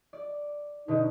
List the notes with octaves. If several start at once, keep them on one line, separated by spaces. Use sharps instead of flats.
D5
B2 D3 D#4